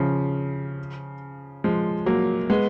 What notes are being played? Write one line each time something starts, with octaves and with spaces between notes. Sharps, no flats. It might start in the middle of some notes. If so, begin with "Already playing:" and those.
Already playing: C#3 F3
F3 G#3
F#3 A#3
G#3 B3